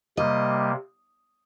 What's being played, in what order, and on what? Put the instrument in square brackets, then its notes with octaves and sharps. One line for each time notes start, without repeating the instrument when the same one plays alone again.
[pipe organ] C3 G3 A#3 [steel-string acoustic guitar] D#5